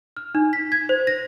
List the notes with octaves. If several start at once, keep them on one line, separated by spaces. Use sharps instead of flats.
F6
D#4
B6
G#6
C5
A#6